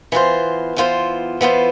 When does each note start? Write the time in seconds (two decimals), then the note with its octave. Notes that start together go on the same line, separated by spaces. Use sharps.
0.12 E3 B3 F4 C5
0.76 E3 B3 F4 C5
1.41 E3 B3 F4 C5